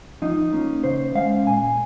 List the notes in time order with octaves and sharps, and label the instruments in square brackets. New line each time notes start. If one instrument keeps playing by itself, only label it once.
[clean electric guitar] F3 D#4
A#3 C#4
C#3 C5
G#3 C#4 F5
A#2 G#5